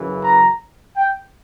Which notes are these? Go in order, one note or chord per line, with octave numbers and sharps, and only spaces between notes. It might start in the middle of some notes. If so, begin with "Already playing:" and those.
Already playing: F#2 C#3 E3
A#5
G5